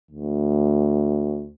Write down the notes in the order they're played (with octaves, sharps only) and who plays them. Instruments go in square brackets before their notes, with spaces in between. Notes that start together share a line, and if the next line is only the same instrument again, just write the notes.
[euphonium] D2